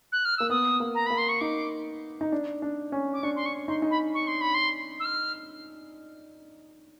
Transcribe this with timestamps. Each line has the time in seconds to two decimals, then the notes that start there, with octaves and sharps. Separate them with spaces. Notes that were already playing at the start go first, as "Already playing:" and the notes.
0.12 F#6
0.25 F6
0.37 A#3 E6
0.50 B3 D#6
0.80 A#3
0.95 A#5
1.06 A#3 B5
1.18 C6
1.29 C#6
1.41 D#4 D6
2.21 D#4
2.32 D4
2.62 D4
2.92 C#4
3.14 D6
3.23 D4 C#6
3.36 C6
3.46 C#6
3.68 D#4 C6
3.82 D#4
3.91 B5
4.14 C#6
4.27 C6
4.41 B5
4.54 C6
5.00 E6
5.05 F6